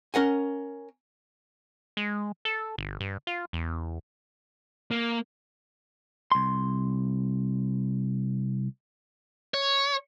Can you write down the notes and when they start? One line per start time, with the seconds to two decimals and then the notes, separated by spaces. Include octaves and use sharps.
0.14 C#4 A#4 F#5 G#5
1.97 G#3
2.45 A4
2.78 G1
3.00 G2
3.27 F4
3.53 E2
4.91 A#3
6.32 C2 C6
9.54 C#5